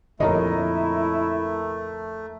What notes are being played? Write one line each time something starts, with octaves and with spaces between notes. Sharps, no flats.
F2 A#2 D3 A3 E4 A#4 C#5 D#5